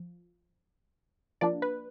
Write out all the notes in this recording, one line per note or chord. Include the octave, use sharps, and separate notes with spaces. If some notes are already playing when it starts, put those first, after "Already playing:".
Already playing: F3
F3 A#3 D4 D5
B4